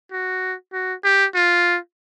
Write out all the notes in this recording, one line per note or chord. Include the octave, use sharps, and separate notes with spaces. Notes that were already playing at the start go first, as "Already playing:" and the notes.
F#4
F#4
G4
F4